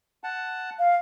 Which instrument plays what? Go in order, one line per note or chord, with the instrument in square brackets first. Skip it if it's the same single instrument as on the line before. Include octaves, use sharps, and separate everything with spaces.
[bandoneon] F#5 A5
[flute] F5